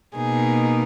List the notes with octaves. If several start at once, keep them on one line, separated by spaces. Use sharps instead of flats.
B2 A#3 D#4 G#4